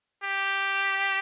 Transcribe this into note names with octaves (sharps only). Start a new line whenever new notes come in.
G4